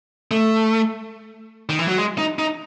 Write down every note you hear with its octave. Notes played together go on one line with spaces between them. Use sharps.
A3
D#3
E3
F#3
G#3
D#4
D#4